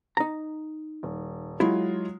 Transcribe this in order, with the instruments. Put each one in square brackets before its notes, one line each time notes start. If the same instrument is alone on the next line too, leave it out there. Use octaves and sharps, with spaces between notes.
[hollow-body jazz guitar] D#4 A#5
[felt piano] D#1
[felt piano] F#3 G#3 F4 [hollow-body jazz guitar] E4